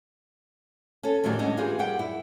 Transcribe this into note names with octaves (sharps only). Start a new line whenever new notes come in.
C#4 A4
F2 A2 D#3 E3 F#3 G3
G#2 C#4 D4 D#5
E3 F4 G4 G#4 B4
F#2 G3 F#5 G5
E4